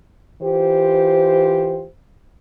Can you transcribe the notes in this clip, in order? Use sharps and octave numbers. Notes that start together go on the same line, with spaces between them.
E3 F4 G4 C5